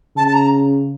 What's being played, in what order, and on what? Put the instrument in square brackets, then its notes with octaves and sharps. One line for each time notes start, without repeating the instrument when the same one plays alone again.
[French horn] C#3 [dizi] A5
[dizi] A5
A#5